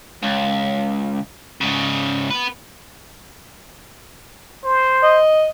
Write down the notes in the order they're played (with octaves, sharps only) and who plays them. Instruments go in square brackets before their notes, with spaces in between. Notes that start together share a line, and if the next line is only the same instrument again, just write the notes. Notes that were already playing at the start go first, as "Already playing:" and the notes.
[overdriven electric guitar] C#2
G#2 C#3
B3 B4
[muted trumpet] C5
[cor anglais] D#5